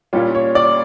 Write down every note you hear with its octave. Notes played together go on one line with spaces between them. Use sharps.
A#2 G3 C#4 F4
C#5
D5